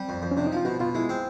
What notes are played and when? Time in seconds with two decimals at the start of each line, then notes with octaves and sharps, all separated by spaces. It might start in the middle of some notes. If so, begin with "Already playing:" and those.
Already playing: G3 C4
0.09 F2
0.22 F2
0.31 C#4
0.37 C3 D4
0.47 D#4
0.52 F3 F4
0.65 B2 F#4
0.80 B2 F4
0.95 G#3 E4
1.09 C4